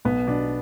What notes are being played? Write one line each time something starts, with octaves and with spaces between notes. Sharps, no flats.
B1 B3
B2 D4